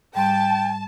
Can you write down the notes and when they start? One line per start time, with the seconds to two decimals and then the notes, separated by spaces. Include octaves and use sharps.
0.15 G#2 G3 G5 A5 C6